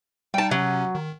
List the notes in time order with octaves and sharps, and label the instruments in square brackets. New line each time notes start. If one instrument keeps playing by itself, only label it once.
[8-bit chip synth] G3 D#4 [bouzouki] G5 A5
[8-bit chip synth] C3 C#4 [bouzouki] F#3
[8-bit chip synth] D#3